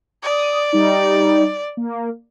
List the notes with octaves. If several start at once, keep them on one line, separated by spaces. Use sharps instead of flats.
D5 D#6
G3 D#4
A#3